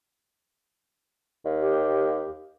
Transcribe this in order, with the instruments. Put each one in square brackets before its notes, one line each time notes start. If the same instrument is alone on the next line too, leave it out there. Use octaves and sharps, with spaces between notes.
[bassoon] D#2
[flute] G4